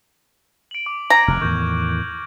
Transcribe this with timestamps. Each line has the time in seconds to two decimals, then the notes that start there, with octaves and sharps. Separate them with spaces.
0.71 D7 F#7
0.86 D6
1.10 A#5 G#6 A#6
1.28 F1 C3 F6 F#6
1.41 E2 A2 D#3 C#6 G6